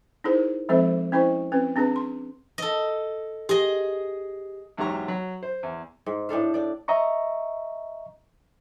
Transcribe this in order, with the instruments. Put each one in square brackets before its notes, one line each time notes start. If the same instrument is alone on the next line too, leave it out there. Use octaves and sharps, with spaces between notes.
[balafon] D#4 E4 G#4 A#4 C5
F3 G#3 C4 A4 C5 E5
C#4 E4 C5 D#5 C#6
C4 C#4 B4
C4 D4 G#4 B4 A#5
C6
[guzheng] A4 D#5
[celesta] G4 [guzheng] G#4 D#5
[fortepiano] E2 G#2 F#3 G4 A#5 C#6
F#3
C5
E2
[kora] G#2
A2 D4 A4 F5
D4 D5
[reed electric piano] D#5 E5 A#5 C#6